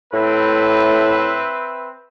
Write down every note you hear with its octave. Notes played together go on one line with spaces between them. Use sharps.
A2 C4 B4 E5